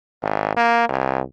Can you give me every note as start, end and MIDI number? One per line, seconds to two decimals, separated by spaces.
0.22 0.52 32
0.57 0.86 58
0.89 1.21 36